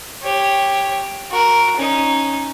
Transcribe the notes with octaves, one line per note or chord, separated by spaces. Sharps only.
G4 C#5
F#4 A#4
C#4 D#4